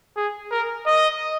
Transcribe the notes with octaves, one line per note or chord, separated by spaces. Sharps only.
G#4
A#4
D#5